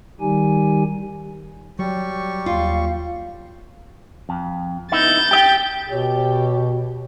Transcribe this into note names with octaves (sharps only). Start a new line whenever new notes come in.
D#3 G3 D#4 G4 G#5
F#3 G3 C#6
D#2 F4 F5
F2
B3 D#4 E4 G6 A6
G4 D#5 G5
B2 G4 C#5